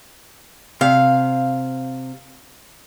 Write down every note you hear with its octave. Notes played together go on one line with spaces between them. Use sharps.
C3 F5